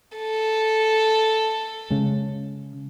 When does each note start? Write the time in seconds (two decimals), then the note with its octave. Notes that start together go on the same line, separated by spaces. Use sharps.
0.18 A4
1.90 C#3 G#3